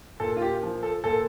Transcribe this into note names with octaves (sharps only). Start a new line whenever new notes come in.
A#2 A4
F4
G4
F3
A4
A#2 A4